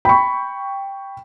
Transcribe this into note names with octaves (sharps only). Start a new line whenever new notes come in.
G5 B5 C#6